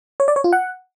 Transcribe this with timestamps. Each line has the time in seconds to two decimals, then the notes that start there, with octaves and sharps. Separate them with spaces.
0.20 C#5
0.28 D5
0.36 C#5
0.44 F4
0.53 F#5